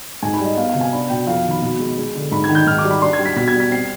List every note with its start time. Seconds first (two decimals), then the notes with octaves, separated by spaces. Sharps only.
0.23 G#2 G#5
0.34 B5
0.40 G3
0.46 D#5
0.57 B3 F5
0.69 F5
0.75 C3
0.81 G#5
0.92 D4 B5
1.10 B2 G5
1.27 F2 F5
1.45 D#3
1.51 B5
1.62 B2
1.79 G#3
1.98 G#3
2.15 D3
2.31 G#2 B5
2.44 G#6
2.49 D#3
2.55 G6
2.67 G#2 F6
2.78 D6
2.85 G3
2.91 B5
3.02 D4 C6
3.13 G#6
3.19 G3
3.25 B6
3.36 B2 B6
3.48 G#6
3.54 G3
3.60 B6
3.71 C4 C7